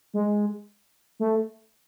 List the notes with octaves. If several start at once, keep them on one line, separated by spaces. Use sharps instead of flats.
G#3
A3